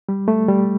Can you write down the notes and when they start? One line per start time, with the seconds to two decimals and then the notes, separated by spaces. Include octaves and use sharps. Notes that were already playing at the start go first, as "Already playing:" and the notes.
0.09 G3
0.28 A3
0.48 G3